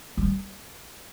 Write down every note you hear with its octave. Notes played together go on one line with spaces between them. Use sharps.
G3